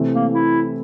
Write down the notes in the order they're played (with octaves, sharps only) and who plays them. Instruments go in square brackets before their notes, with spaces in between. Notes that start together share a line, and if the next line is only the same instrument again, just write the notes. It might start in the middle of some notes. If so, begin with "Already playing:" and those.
Already playing: [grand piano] C3 E3 A3 C4
[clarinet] A#3
E4